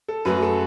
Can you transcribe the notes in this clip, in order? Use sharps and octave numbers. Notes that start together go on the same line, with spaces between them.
A4
F#2 F#3 A3 B4
A4